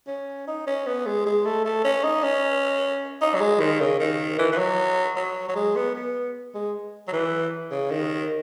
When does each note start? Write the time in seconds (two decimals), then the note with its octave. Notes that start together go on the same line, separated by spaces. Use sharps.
0.08 C#4
0.47 D#4
0.67 C#4
0.87 B3
1.06 G#3
1.26 G#3
1.45 A3
1.66 A3
1.85 C#4
2.04 D#4
2.24 C#4
3.22 D#4
3.35 F#3
3.41 G#3
3.60 D#3
3.80 C#3
3.99 D#3
4.39 E3
4.52 E3
4.58 F#3
5.17 F#3
5.49 F#3
5.56 G#3
5.76 B3
5.95 B3
6.55 G#3
7.08 F#3
7.13 E3
7.71 C#3
7.91 D#3